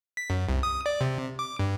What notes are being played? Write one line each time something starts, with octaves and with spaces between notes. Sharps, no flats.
B6
F#2
C2
D#6
D5
C3
D6
G2